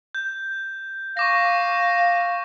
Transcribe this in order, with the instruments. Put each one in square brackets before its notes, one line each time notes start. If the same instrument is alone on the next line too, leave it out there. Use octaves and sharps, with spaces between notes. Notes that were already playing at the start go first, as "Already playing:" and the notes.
[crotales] G6
[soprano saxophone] F5 [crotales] C#6 D6 A#6